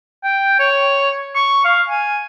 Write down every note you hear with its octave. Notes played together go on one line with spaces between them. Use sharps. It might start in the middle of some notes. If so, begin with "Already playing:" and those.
G5
C#5
C#6
F5
G#5